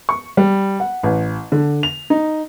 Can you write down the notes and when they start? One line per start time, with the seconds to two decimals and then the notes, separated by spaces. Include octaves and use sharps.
0.09 C#6
0.37 G3
0.80 F#5
1.03 A1
1.52 D3
1.83 F7
2.10 D#4